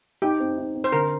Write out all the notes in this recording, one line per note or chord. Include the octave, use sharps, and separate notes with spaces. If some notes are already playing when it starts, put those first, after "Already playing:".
D#4 G4
C4
D#4
C4
C5
D3 A#4